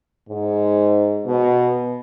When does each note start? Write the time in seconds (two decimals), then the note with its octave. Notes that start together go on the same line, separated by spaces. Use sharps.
0.29 G#2
1.26 B2